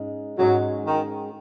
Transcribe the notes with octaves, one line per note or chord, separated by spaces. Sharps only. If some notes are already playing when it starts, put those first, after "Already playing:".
Already playing: G#2 G#3 C#4
G#2 F#3 G#3 C#4 G#4
D#3